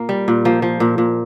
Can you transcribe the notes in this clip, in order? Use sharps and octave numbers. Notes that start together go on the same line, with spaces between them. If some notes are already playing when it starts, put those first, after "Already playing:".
Already playing: A#2 A#3
G3
A#2
F3 A#3
F3
A#2
A#2